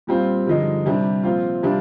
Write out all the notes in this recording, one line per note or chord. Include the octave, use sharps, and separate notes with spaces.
A#2 G3 C4 F4
G2 D3 F3 G#3 D#4
C3 G3 D4
A#2 F3 C4 F4
C3 G3 D4 F4